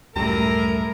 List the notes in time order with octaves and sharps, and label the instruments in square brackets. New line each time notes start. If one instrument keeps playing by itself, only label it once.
[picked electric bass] C#2 F#2 G3 [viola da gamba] A2 [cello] A#4 [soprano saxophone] A#5